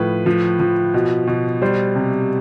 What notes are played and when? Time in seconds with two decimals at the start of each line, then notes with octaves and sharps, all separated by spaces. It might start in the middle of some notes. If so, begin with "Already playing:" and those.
Already playing: A2 F3 B4
0.26 F3
0.60 F3
0.94 B2
1.27 B2
1.62 G3 C5
1.96 C3